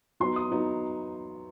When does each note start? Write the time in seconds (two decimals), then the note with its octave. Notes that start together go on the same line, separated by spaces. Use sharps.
0.20 F#3 B3 D#4 C6
0.36 D#6
0.52 F#3 B3 D#4